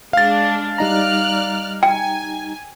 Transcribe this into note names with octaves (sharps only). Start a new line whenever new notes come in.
G#3 D4 F5 A6
G3 D#4 D5 A#5 F6 F#6
G5 G#5